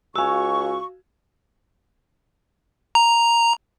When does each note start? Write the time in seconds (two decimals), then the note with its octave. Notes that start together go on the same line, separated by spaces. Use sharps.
0.16 C#2 F#4 F5 G#5 C#6 E6
2.95 A#5